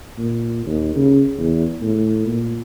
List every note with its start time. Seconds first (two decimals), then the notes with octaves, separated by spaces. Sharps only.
0.18 A#2
0.65 D#2
0.95 C#3
1.38 E2
1.82 A2
2.27 A#2